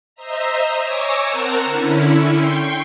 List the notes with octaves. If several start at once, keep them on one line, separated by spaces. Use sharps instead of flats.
C5 D#5 E5 A#5
C#5 G#5 C#6 D6 E6 A#6
C4 A#4 C5 F#5 A5 A#5
D3 C#4 E4
G5 C6 C#6